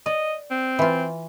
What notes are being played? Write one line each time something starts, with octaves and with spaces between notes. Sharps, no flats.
D5 D#5
C4
E3 F4